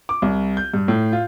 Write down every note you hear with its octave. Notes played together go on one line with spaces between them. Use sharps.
D6
C2
G6
G2
A2
F4